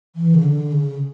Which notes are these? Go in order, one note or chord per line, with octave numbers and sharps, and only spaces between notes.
E3
C#3
D3
C#3